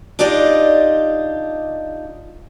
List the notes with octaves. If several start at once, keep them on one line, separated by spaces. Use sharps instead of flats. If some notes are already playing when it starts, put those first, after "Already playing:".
D4 D#4 F4 G4 D5 D#5